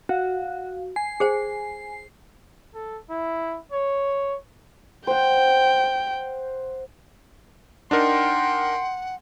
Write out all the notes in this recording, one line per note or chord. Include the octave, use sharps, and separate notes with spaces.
F#4 F5
G#5 C7
G#4 C5 G5
A4
E4
C#5
C5 F#5 G5
D4 D#4 A#4 F#5 G5 C6